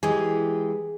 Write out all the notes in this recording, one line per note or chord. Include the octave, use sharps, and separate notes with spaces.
E3 G#3 G4 G#4